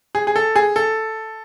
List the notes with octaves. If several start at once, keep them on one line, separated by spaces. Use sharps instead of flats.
G#4
G#4
A4
G#4
A4